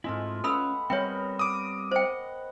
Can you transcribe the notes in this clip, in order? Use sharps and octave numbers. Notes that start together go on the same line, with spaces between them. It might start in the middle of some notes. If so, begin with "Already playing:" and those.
G#2 G#3 A3 C4 E4 F4
C#4 A4 B4 F5 F#5 B5 E6
G3 B3 C4 A#4 C#5 G5 C#6
D6 D#6
C5 D#5 F#5 G5